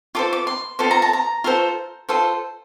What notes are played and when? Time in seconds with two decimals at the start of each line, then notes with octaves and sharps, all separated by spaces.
0.15 F4 A4 C5 D6
0.33 D6
0.47 C6
0.79 F4 A4 C5 C6
0.91 A#5
1.02 A5
1.13 A#5
1.44 F4 A4 C5
2.09 F4 A4 C5